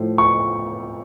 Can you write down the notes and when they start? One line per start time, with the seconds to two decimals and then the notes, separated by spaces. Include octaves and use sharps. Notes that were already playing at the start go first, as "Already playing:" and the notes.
Already playing: A2 F3
0.18 C#6